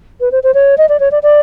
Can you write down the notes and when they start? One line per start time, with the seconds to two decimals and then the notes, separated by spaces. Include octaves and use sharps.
0.21 B4
0.32 C5
0.43 C5
0.54 C#5
0.78 D#5
0.89 D5
1.00 C#5
1.11 D5
1.23 D5